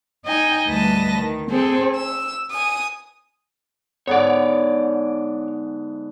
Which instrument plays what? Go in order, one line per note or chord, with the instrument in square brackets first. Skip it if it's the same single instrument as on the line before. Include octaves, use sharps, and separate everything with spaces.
[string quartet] D#4 D#5 G5 G#5
D2 G3 B4 D#5 A5 A#6
D#3
C4 G#4 A4 C5
E6
G#5 D#6
[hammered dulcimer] G#2 D3 B3 [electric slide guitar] C#5 D5